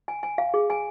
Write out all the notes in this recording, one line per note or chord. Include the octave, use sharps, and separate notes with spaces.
G#5
G#5
F5
G#4
G#5